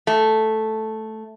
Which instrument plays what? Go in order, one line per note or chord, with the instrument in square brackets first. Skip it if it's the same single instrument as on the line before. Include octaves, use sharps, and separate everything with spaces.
[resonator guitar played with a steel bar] A3